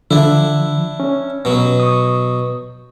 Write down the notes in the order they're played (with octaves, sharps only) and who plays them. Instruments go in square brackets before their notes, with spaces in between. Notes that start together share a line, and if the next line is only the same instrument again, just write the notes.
[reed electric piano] D3 F3 [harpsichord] D4 E4
[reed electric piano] C#4
[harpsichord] B2 F#3
[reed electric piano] C#6 D#6